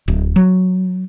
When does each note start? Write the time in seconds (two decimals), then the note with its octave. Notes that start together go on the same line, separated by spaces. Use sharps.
0.08 D1
0.36 F#3